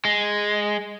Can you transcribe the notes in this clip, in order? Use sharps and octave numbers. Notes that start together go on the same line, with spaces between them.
G#3